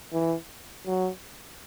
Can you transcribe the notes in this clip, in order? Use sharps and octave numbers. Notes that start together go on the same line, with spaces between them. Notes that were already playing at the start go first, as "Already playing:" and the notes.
E3
F#3